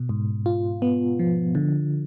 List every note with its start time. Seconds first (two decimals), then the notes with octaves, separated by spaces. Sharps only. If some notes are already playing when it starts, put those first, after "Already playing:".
Already playing: B2
0.09 G#2
0.46 F4
0.82 B3
1.19 F3
1.55 D3